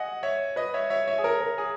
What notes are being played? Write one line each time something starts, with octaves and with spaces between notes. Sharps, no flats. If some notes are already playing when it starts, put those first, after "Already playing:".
Already playing: D#5 F#5 G#5
C#5 E5
B4 D#5
C#5 E5
C#5 E5
C#5 E5
G#4
A#4
A#4
G#4